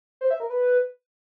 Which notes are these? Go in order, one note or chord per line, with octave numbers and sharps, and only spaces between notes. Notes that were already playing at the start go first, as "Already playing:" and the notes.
C5
E5
A#4
B4